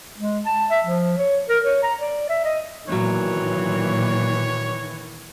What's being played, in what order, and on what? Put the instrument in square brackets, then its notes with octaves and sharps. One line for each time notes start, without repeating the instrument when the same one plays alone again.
[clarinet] G#3
A5
E5
F3
C#5
A#4
C#5
A#5
D5
E5
D#5
[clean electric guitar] B1 F#3 [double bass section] A#2 [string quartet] D#3 E3 [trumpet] C#5